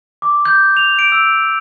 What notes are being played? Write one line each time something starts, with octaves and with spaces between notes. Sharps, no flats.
D6
G6
F7
D7
E6